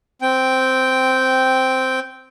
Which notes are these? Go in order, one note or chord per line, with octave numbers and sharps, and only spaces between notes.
C4 G5